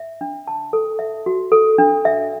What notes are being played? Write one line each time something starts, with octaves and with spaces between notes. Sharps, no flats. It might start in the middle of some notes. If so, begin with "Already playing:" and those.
Already playing: E5
D4
A5
A4
E5
F#4
A4
D4
E5